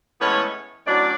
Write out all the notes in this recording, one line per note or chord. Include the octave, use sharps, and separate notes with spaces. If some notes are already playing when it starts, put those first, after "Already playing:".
A2 E3 G#3 B3 C#4 E4 C#5
A2 F#3 C#4 D4 D5